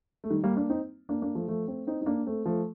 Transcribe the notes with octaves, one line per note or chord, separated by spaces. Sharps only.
A3
D#3 G3
G3 A#3
A#3 D4
C4 D#4
A#3 D4
A#3 D4
F3 A3
F3 A3
A3 C4
C4 D#4
D#4
A#3 D4
A3 C4
F3 A3